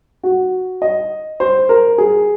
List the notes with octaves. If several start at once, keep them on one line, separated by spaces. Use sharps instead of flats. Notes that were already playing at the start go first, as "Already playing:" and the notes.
F#4
D#5
C5
A#4
G#4